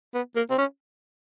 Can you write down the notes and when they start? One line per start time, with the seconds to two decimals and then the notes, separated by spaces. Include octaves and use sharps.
0.14 B3
0.36 A#3
0.51 C4
0.58 C#4